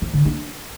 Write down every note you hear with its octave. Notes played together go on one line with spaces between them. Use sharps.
F3
D3
D4